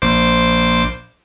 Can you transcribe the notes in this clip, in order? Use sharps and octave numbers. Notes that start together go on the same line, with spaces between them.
A#1 C5 D6